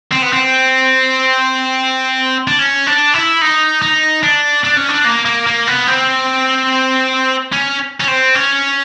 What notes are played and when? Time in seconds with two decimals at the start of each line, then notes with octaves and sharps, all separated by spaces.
0.11 C4
0.22 B3
0.32 C4
2.48 D4
2.59 C#4
2.87 D4
3.14 E4
3.41 D#4
3.82 D#4
4.23 D4
4.65 D4
4.77 C#4
4.89 D4
5.05 A#3
5.25 A#3
5.47 A#3
5.67 B3
5.87 C4
7.53 C#4
8.00 C#4
8.08 C4
8.35 C#4